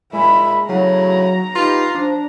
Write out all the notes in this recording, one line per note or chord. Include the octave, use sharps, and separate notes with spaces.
A#2 G#3 E5 B5
C#3 F#3 A3 E4 A#5
D#4 F4 G4 B4 C7
F3 D4